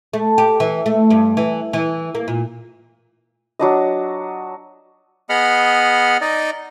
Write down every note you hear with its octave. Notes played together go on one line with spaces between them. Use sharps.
A3
G4
E3
A3
G2
E3
E3
A#3
A#2
F#3 D4 D#5
B3 G#4 D#5 F#5 B5 F6
D#4 D5 D#5